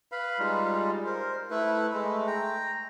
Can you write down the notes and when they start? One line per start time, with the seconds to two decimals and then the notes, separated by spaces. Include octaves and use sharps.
0.12 B4 F5 B5
0.39 G3 G#3 D#4 F4
1.06 A#4 C5
1.50 A3 E4 B4
1.94 G#3 A3
2.27 G5 A#5